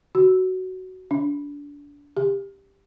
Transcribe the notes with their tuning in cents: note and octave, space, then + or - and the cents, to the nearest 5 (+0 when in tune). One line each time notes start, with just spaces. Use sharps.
F#4 +10
D4 -25
G4 +10